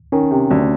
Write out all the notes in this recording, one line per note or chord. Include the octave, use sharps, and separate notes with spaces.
D#3 C#4
C3
D2